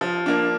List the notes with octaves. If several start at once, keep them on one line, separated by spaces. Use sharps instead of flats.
F3
A#3 D4